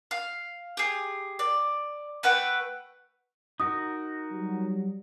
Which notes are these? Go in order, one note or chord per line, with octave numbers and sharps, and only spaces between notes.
F5
G4 G#4
D5
A3 B4 F#5 G5
D#4 F#4 A#4 D#6
F#3 G3